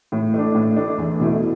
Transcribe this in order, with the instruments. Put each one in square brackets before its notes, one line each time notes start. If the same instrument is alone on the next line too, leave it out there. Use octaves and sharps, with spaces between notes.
[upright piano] A2
A3 D4
A2
A3 D4
E2
B2 A3 E4